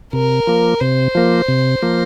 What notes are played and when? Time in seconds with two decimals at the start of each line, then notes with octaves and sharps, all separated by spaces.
0.13 C3 A#4
0.47 F3 A#3
0.81 C3 C5
1.15 F3 A#3
1.48 C3
1.82 F3 A#3